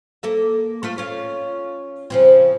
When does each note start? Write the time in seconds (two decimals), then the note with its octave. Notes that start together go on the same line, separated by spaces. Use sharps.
0.23 A#3 A4 E5
0.83 A3 F4 E5
0.98 C#4 F4
2.10 C#3 F3 C4